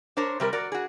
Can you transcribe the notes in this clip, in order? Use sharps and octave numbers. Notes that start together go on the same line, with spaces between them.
D4 A#4 C5 C#5
C3 G3 A3 A#4
F#4 A#4 D5
F#4 G#4